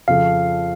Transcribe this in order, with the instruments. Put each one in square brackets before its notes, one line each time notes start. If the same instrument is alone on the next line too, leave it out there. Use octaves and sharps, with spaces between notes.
[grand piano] F2 C#3 F3 [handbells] F5